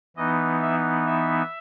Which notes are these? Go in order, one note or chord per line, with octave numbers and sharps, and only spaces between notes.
E3 B3 D#4 D#5
E5
E5